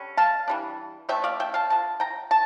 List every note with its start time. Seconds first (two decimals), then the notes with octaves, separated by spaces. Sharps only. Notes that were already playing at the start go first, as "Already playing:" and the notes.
Already playing: D3 G3 C#4
0.17 F5 A5
0.48 E3 G3 D4
1.09 D3 A3 C#4 E5 G5
1.24 D5 F5
1.40 E5 G5
1.54 F5 A5
1.70 D3 F3 A5
2.00 G5 A#5
2.31 A5